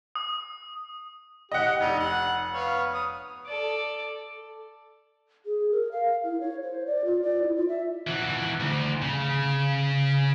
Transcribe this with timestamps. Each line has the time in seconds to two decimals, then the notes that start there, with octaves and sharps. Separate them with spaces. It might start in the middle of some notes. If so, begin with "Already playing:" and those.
0.15 D#6
1.52 G4 D#5 F#5
1.80 F1 D4 D#4
2.00 F#5
2.53 B3 C#5 F5
2.94 D#6
3.47 A4 D5
5.46 G#4
5.71 A#4
5.92 F5
6.24 E4
6.41 C#5
6.63 C5
6.86 D5
7.05 F4
7.22 D5
7.42 E4
7.56 F4
7.69 E5
8.07 E3 F#4
8.60 D2
9.02 C#3